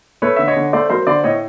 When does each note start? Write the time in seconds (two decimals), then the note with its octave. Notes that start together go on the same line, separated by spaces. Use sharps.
0.22 A3 B4 C#5
0.36 D3 E5
0.48 C#5 D#5
0.56 D3
0.73 A3 C5 D5
0.90 F#3 A#4 C5
1.07 D3 C5 D5
1.24 A2 C#5 D#5